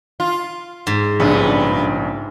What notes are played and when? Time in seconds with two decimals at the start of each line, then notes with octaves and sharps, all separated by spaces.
0.20 F4
0.87 G#2
1.20 A#1 G2 C#3 B3